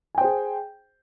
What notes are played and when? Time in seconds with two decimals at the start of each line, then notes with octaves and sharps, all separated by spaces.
0.15 G#5
0.18 G5
0.21 C5
0.24 G#4